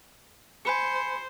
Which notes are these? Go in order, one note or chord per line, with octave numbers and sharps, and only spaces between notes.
C5 G#5 B5 C#7